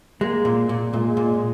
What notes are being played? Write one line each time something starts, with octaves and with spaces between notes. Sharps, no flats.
G#3 A#3
A#2
A#2
A#2 G#3
A#2